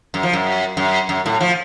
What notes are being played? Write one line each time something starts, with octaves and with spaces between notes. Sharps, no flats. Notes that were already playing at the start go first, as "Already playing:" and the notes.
F#2
F3
F#2
F#2
F#2
A2
F3